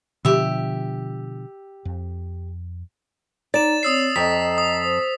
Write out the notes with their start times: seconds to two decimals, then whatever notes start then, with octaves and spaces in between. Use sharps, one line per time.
0.25 B2 D3 F3 G4 E5
1.85 F2
3.54 D#4 D5 A#5 A6 E7
3.83 C4 C#5 D#6 E6 C7
4.16 F2 D#5 A#5 B6
4.58 D#6
4.84 C5